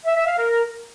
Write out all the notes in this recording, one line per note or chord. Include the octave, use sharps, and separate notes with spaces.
E5
E5
F5
A#4